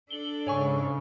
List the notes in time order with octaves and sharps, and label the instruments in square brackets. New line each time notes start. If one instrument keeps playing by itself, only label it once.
[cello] D4 A4 [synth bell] F#7 G7
[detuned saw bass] G#2 [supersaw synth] C#3 [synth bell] C#5 G#5 C#6